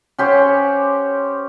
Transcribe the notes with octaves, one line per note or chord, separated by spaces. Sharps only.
C#4 G4 C5 F#5